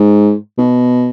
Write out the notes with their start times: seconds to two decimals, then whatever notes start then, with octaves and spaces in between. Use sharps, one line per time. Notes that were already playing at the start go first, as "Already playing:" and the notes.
Already playing: G#2
0.58 B2